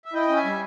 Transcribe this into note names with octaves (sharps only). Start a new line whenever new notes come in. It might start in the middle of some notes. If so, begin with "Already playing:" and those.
E5
E4 D#5 G5
C#4
E5 G#5
G3